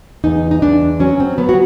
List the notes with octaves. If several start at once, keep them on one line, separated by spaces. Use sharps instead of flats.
E2 D#4
D#4
E2 D4
F#3 C#4
C4
F#3 B3
F#4